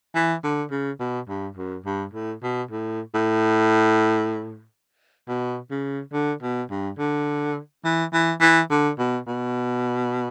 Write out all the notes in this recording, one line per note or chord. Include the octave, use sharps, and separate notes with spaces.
E3
D3
C#3
B2
G2
F#2
G2
A2
B2
A2
A2
B2
C#3
D3
B2
G2
D3
E3
E3
E3
D3
B2
B2